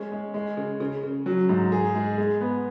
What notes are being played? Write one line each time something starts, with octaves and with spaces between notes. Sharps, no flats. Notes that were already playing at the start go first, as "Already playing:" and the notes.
Already playing: G#3 C#4
G#3
G#3
C#3
C#3
C#3
F#3
G#2
G#4
G#3
G#3
B3